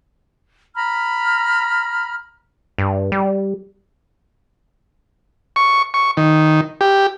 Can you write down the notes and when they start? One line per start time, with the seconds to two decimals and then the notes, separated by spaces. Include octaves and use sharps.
0.75 A#5 B5 F6
2.78 G2
3.12 G3
5.56 C#6
5.94 C#6
6.17 D#3
6.81 G4